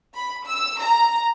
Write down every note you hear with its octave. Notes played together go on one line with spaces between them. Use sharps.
B5
E6
A#5